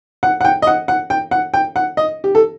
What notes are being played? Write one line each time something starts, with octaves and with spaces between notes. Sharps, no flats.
F#5
F#5
G5
D#5
F#5
F#5
G5
F#5
G5
F#5
D#5
G4
A4